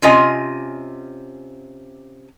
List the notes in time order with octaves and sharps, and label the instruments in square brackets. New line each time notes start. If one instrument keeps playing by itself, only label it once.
[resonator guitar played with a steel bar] C3 C#4 F4 D#5 G#5